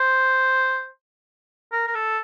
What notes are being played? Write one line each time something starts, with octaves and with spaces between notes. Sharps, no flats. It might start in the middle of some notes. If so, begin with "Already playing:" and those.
Already playing: C5
A#4
A#4
A4